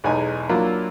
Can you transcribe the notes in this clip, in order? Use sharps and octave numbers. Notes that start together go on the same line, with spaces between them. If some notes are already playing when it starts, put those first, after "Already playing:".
B1 E2 G#3 D#4 G#5
F#3 A#3 D4 E4 F4